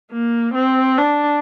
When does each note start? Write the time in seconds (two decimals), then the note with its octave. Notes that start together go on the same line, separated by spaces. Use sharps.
0.12 A#3
0.54 C4
0.98 D4